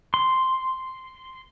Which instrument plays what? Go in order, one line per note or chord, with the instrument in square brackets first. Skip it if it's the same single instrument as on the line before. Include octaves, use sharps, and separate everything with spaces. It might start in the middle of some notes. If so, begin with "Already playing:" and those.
[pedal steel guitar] C6